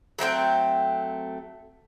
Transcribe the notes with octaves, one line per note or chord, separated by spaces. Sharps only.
F#3 A3 C4 G5